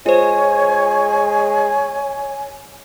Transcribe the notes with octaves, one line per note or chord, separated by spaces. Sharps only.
G#3 F4 C5 C#5 G#5